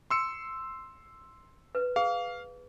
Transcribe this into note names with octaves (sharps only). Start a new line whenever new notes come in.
C6 E6 C#7
B4
G#4 F5